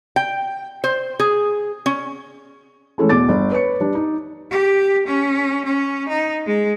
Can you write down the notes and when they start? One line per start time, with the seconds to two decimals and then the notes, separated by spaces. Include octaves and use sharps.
0.16 G5
0.84 C5
1.20 G#4
1.86 C#4
2.98 E3 G#3 A3 C#4 A4
3.09 E2 B2 D6 A6
3.28 G1
3.52 B4 C#5 C#7
3.80 G3 D4
3.95 D#4
4.51 G4
5.07 C#4
5.65 C#4
6.09 D#4
6.46 G#3